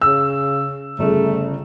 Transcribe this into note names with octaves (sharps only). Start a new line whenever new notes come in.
C#3 E6
G1 C#3 A3